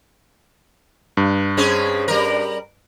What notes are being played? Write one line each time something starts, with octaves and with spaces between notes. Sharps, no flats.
G2
C4 C#4 G#4
G3 A#4